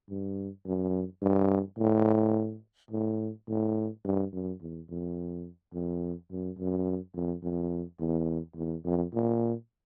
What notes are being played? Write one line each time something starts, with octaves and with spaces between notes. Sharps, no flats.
G2
F#2
G2
A2
A2
A2
G2
F#2
E2
F2
F2
F#2
F#2
F2
F2
E2
E2
F2
A#2